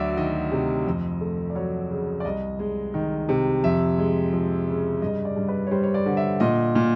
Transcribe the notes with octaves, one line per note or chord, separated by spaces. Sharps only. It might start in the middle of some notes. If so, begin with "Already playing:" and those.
Already playing: D2 F#3 D5 E5
D#3 D#5
C3
F2
A3
D5
F#3 C#5
C#3
D5
C2 D#5
G#3
D#3
C3
F2 E5
G#3
F3
C#3
G2 D#5
D5
G2
B4
C#5
G3 C5
C#5
D5
D3
E5
A#2 D#5
A#2